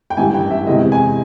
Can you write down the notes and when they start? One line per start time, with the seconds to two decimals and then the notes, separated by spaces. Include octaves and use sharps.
0.10 G5
0.17 A1 G2 E3 G#5
0.34 G5
0.50 E5
0.67 E2 C3 E3 G#3 D#5
0.92 G#5